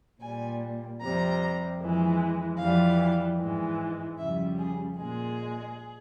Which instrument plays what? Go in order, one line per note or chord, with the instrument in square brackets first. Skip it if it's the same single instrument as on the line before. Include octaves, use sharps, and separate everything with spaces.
[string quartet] A#2 G3 G#5
F2 C3 G3 A#5
F2 E3 G#3
F2 E3 G3 F5
G#2 E3 G#3
F2 C#3 G3 E5
G#4
A#2 G#3 G#4